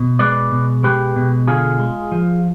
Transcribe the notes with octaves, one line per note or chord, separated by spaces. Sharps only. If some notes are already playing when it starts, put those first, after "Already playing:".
Already playing: B2
G#3 B4 D5
B2
G#3 G4 B4
B2
D3 F4 G#4
G#3
F3